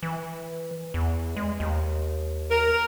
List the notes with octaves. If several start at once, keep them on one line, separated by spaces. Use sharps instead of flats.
E3
E2
G#3
D#2
A#4